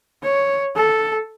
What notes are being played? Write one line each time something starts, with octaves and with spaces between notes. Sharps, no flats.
C#5
A4